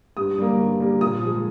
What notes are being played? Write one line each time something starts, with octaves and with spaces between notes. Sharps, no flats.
G2 D#6
G3 A#3
G2
G3 A#3
A#2 D#6
F3 G#3